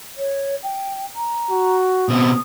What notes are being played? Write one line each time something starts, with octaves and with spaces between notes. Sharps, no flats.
C#5
G5
A#5
F#4
B2 C4 D#6